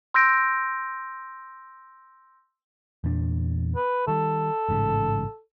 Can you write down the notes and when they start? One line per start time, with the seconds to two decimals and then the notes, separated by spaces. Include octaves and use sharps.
0.14 C6 E6 G6 A#6 D7
3.04 E2 A#2 D4
3.76 B4
4.08 D#3 G3 A4
4.69 A1 G#2 C#3